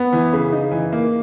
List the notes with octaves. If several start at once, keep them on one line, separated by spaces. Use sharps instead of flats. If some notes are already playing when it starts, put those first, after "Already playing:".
Already playing: B3
E3
C#3
D#4
E3
A#3